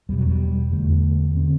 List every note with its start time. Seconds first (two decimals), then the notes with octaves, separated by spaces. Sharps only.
0.09 E2 B2 G3
0.18 F#3
0.27 G3
0.72 E2 D3 A3
1.35 D3 C4